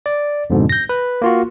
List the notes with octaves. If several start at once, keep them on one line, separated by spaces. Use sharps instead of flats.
D5
F2 G#2 B2 D3
G6 A#6
B4
A#3 F4 F#4